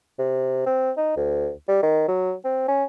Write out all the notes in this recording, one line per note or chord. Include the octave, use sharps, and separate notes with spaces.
C3
C4
D#4
D2
G3
D#3
F#3
C4
C#4